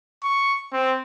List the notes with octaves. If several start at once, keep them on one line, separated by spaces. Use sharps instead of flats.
C#6
C4